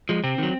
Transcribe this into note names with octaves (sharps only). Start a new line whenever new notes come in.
F3 G#3
C3 C4
D#3 F#3